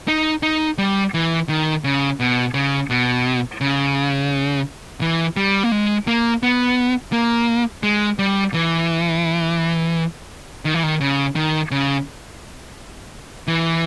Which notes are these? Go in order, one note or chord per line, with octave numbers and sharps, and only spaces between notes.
D#4
D#4
G3
E3
D#3
C#3
B2
C#3
B2
C#3
E3
G3
A#3
G#3
A#3
B3
A#3
G#3
G3
E3
D#3
E3
D#3
C#3
D#3
C#3
E3